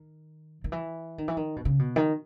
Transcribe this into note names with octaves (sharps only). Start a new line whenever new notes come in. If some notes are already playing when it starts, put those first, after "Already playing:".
Already playing: D#3
D#3
E3
D#3
E3
D#3
B2
C#3
B2
D#3